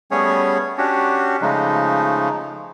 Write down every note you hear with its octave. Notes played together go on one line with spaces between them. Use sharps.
G3 A3 B3 C#4 G#4 C#5
C#4 D4 F#4 G4
C#3 F3 G#3 A3 D#4